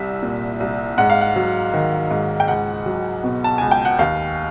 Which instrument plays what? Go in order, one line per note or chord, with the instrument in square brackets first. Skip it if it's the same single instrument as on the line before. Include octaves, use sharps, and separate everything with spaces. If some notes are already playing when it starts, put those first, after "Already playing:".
Already playing: [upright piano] C2 G3 E5
A#2
C2
G#2 F#5
F5
F#5
F#3
D#3
G#2
G5
C#2 F#5
F#3
B2
A5
C#2 G#5
G5
F#5
D#2 F5